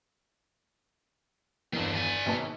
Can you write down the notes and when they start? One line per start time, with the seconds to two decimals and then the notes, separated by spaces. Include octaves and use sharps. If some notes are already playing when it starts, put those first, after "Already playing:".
1.73 G1 E2 D#3 D4
1.95 D5 G#5
2.26 G#1 B2 A5